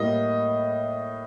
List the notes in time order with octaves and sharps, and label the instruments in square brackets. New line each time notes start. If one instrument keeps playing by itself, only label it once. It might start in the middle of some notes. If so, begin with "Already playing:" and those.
Already playing: [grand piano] A2 G3 A#3 D#5